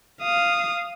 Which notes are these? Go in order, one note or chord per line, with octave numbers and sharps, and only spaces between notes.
F5 D#6